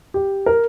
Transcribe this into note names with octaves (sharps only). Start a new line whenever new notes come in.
G4
A#4